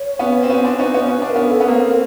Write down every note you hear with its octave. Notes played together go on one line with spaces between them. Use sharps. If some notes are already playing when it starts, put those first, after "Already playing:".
Already playing: C#5
B3 C#4
C4
B3 C#4 C5
C4 D4
C#4 D#4 B4
B3 C#4 C#5
C#4 B4
D4
A#4
B3 C#4
A4
B3
A#3 C4 A#4
A#4